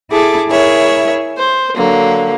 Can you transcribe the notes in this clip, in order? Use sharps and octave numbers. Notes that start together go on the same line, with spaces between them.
E4 G#4 A4 D6
E4 G#4 A#4 C#5 E5
C5
D3 F#3 A#3